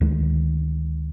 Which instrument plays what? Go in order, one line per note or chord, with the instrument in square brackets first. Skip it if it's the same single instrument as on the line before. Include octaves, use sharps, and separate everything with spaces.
[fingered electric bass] D2 D#3 G#3